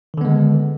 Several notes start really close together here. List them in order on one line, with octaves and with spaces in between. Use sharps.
D#3 D3 B3 G#3